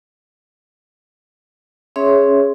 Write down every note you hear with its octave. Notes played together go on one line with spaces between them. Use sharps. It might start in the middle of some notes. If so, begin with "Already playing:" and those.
C#4 G#4 C#5 E5 C6